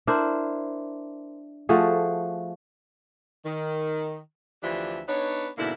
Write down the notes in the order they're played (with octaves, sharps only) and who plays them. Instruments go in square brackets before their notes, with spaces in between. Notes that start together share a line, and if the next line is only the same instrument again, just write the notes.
[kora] D4 E4 A#4 C5
F3 A3 F#4 G#4
[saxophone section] D#3
D2 E3 F3 D4 G4 E5
B3 D4 D#4 B4 C#5
G#2 B2 D3 A#3 E4